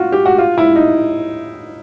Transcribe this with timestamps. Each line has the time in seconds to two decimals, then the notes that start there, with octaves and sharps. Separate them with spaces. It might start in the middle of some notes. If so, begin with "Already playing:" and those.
Already playing: F4 F#4
0.12 G4
0.26 F#4
0.38 F4
0.58 E4
0.76 D#4